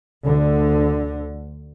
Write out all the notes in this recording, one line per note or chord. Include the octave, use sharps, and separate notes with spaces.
D2 D3